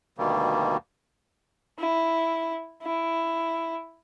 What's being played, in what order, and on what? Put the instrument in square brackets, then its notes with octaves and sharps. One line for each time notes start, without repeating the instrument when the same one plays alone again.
[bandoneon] D2 B2 D#3 G3 A#3
[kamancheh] E4
E4